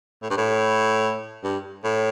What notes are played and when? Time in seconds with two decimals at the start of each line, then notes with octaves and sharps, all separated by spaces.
0.22 A2
0.30 G2
0.37 A2
1.44 G2
1.84 A2